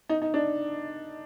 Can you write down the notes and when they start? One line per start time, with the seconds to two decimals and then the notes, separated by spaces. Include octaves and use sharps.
0.09 D#4
0.22 D#4
0.34 D4